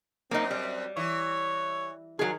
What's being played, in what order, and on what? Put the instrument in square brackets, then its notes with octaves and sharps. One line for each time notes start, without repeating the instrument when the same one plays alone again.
[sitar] F#2 [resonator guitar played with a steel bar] A#3 D#4 [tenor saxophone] C4
[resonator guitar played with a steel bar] G3
[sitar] E3 [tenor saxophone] C#5
[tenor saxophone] D#3 [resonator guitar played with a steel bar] F#3 G#4